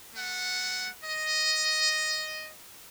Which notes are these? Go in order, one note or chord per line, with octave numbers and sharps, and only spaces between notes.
A3 F#5
D#5